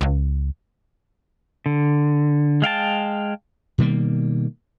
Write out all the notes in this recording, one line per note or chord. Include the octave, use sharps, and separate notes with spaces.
C#2
D3
G#3 F5 G5 A5
B2 D#3 G3 A#3